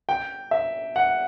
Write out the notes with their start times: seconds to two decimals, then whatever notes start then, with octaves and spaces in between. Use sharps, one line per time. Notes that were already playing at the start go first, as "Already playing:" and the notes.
0.09 G5
0.51 E5
0.96 F#5